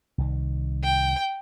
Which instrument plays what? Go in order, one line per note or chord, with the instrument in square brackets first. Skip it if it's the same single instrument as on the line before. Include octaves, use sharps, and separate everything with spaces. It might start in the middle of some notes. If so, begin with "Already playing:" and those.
[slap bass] C2 D#3
[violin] G5